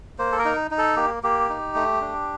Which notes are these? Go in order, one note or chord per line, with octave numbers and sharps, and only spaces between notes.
A#3 C5
A4
A#4
D#4
D#4
A4
A#3 G4
A#3 G4
D#4
A3
D4